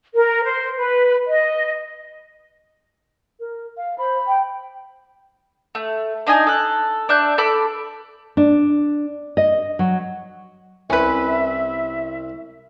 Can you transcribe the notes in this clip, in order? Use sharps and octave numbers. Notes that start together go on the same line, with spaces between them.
A#4
C5
B4
D#5
A#4
F5
C5 B5
G5
A3
D4 D#4 D#5 G#5
A4 F#6
D4 E5 F#6 G6
A4 B5 D6
D4
D#5
F#3
C2 C#4 B4 E5 B5